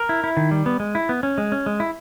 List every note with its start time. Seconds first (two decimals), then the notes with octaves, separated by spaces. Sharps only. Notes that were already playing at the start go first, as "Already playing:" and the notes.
Already playing: A#4
0.09 E4
0.24 E4
0.37 D#3
0.51 G3
0.66 B3
0.80 G#3
0.95 E4
1.09 B3
1.23 C#4
1.38 G#3
1.52 C#4
1.66 G#3
1.80 E4